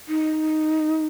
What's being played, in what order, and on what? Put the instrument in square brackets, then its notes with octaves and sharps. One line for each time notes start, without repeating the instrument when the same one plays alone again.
[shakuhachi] D#4